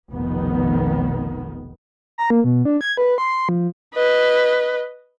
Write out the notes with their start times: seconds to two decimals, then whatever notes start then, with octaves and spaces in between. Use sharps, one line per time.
0.12 F1 B1 D#3 B3
2.18 A#5
2.30 A#3
2.44 B2
2.65 D4
2.81 G#6
2.97 B4
3.18 C6
3.49 F3
3.95 B4 D#5